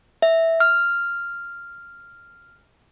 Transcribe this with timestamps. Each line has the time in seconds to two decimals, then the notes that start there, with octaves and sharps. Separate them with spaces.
0.22 E5
0.60 F6